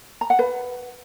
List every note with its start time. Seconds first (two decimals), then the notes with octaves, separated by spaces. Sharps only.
0.21 A#5
0.30 F#5
0.39 B4